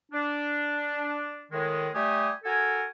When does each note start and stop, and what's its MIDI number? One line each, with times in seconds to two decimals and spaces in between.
0.12 1.44 62
1.52 1.89 45
1.52 1.89 51
1.52 1.89 56
1.94 2.31 55
1.94 2.31 57
1.94 2.31 67
1.94 2.31 80
1.94 2.31 87
2.44 2.84 66
2.44 2.84 69
2.44 2.84 70
2.44 2.84 80